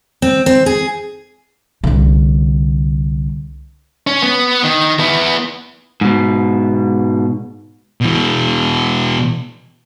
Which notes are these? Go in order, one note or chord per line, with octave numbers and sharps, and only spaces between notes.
C4
C4
G#4
C2 D3
C#4
B3
D#3
B3 E4
G#2 B2
B2 E3